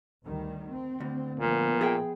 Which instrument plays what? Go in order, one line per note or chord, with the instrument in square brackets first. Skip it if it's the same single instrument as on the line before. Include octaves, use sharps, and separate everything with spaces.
[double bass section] D2 D#3 G3
C4
[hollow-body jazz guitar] D2
[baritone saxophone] A#2 [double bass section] F3 B3
[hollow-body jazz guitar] G#4 E5 G5